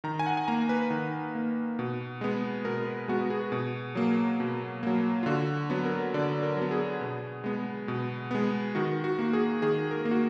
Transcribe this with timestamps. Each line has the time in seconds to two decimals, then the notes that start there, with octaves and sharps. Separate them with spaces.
0.04 D#3 A#5
0.19 G#5
0.26 F#5
0.37 G#5
0.48 A#3 A#5
0.69 B4
0.90 D#3
1.35 A#3
1.79 B2
2.21 G#3 B3
2.65 B2 A#4
2.87 B4
3.08 G#3 B3 F#4
3.30 G#4
3.52 B2
3.95 F#3 A#3
4.40 B2
4.83 F#3 A#3
5.23 F4
5.26 D3 F#4
5.70 F#3 B3
5.85 A#4
6.14 D3 D5
6.43 A#4
6.57 F#3 B3
6.71 G#4
7.01 B2
7.44 G#3 B3
7.88 B2
8.31 G#3 B3
8.75 D#3 F#4
9.04 F#4
9.19 A#3 F#4
9.33 G#4
9.62 D#3 G#4
9.91 A#4
10.05 A#3
10.11 F#4